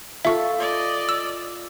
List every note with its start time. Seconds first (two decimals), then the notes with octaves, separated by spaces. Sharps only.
0.25 F4 A4 A#4 E5 C#6
0.59 D5 D#5
1.09 E6